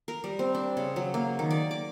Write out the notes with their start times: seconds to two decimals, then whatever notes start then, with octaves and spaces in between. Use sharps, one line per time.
0.08 A#4
0.24 G3
0.39 C4
0.55 D4
0.77 C#3
0.96 F#3
1.14 A#3
1.39 D#3
1.51 D5
1.71 D6